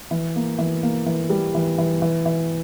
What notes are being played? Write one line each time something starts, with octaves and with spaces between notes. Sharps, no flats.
E3
A#3
E3
A#3
E3
G3
E3
E3
E3
E3